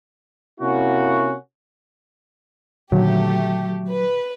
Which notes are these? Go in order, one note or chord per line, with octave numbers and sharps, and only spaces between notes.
C3 A#3 C#4 E4 F#4
A#2 D3 D#3 F#3 A3 G4
B4